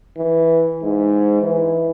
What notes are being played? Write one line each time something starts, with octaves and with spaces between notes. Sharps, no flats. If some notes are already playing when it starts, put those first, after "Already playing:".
E3
G#2
E3